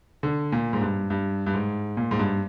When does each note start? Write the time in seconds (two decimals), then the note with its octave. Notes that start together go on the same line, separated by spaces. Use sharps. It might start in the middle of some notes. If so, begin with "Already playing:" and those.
0.23 D3
0.52 A#2
0.73 G#2
0.81 G2
1.10 G2
1.46 G2
1.54 G#2
1.97 A#2
2.11 G#2
2.19 G2